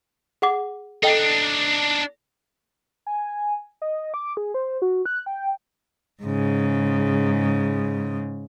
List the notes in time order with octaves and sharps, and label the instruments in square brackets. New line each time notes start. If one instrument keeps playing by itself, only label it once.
[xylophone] G#4 F#5 D6
[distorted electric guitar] D4 D#4 [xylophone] A4 D#5 G5
[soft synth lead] G#5
D#5
D6
G#4
C5
F#4
F#6
G5
[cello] G#2 C#3